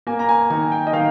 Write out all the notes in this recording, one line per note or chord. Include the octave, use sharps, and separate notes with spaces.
A#3 G#5
A#5
G#5
D#3 G#5
G5
D#5
D#3 F5